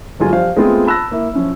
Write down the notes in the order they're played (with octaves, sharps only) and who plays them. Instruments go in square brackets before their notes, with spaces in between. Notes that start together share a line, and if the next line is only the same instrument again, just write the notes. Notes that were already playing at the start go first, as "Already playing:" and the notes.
[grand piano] G1 F#3 G#3 F4 G#5
F3 G3 C5 F5
G#3 A3 B3 C4 F4 G#4
A5 B5 E6 F#6 A#6
A#3 E4
F3 C#4 E4